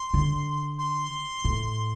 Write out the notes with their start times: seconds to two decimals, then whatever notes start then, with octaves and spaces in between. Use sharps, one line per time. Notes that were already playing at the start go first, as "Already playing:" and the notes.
Already playing: C6
0.14 D3
0.79 C6
1.45 A2